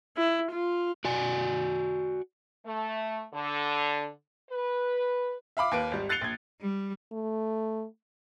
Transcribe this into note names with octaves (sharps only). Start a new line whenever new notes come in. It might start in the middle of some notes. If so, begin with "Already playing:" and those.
E4
F4
F#4 D5 G#5
A3
D3
B4
E5 F5 B5 D6
D#2 A#3 B4 D7
G#1 G3
F#6 A6 C7 C#7 F7 G7
A#1 G#6
G3
A3